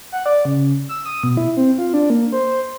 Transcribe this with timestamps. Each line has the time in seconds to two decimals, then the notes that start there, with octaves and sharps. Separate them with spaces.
0.12 F#5
0.26 D5
0.45 C#3
0.89 E6
1.06 D#6
1.23 B2
1.37 E4
1.57 C4
1.78 F4
1.94 D4
2.10 A#3
2.32 C5